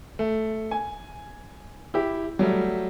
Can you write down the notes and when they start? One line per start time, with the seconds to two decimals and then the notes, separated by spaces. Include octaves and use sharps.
0.19 A3
0.71 G#5
1.94 E4 G4
2.39 F#3 G3 A3